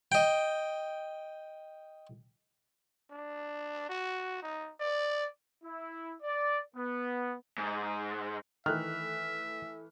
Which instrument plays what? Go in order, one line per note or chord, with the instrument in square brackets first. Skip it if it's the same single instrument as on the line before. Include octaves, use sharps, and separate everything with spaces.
[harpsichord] D#5 G5
[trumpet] D4
F#4
D#4
D5
[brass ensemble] E4
D5
B3
[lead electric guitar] G#2
[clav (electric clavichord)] D#3 [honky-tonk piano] E3 A3 [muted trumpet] E5 [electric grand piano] F6 F#6